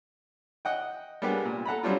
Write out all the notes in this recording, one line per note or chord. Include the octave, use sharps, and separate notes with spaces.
D#5 F#5 G5
G3 G#3 A#3 B3 D4 G4
A#2
A4 F#5 A#5 B5
F#3 G3 C4 D4 F4